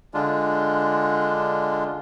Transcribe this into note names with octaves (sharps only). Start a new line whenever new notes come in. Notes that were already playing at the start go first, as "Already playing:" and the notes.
D3 G#3 D4 F4